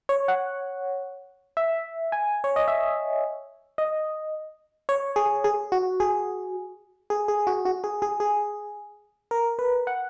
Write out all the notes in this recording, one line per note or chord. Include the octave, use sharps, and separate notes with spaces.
C#5
F#5
E5
G#5
C#5
D#5
E5
D#5
C#5
G#4
G#4
F#4
G#4
G#4
G#4
F#4
F#4
G#4
G#4
G#4
A#4
B4
F#5